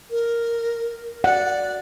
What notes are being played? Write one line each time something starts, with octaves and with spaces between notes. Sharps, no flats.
A#4
D5 F#5